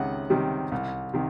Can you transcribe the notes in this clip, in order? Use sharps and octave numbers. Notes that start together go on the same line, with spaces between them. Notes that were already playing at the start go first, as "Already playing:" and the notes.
Already playing: C#2 C3 D#3 F#5
C3 D#3 G3
C2
C3 D#3